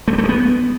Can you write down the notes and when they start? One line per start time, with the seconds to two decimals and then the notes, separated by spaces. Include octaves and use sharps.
0.08 A3
0.13 G3
0.18 A3
0.24 G#3
0.29 B3